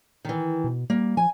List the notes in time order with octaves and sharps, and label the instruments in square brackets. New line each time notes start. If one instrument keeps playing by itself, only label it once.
[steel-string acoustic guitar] D#3 E3
[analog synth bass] B2
[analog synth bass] G3 [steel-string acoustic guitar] A#3
[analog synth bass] F3 [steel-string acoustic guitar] G#5